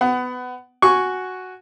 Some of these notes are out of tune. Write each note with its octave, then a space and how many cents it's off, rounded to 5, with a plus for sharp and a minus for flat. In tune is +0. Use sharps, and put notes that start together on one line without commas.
B3 +20 F#5 +20
F#4 +0 G#5 +0 C#6 +0